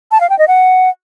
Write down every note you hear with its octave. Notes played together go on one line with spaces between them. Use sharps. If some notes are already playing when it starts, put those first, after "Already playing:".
A5
F5
G5
D#5
F#5